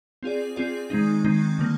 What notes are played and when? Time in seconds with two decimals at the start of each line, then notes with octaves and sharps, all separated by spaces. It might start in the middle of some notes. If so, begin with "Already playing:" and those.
0.23 C4 F4 G#4 D5
0.56 C4 F4 G#4 D5
0.90 D#3 G#3 C4 D#4
1.24 D#3 G#3 C4 D#4
1.59 D3 G3 A#3